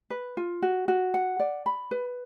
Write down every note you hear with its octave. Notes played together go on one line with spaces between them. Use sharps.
B4
F4
F#4
F#4
F#5
D5
B5
B4